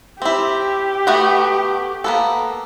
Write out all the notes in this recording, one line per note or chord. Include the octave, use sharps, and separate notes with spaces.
C4 E4 G4
A3 B3 F#4
A#3 B3 A4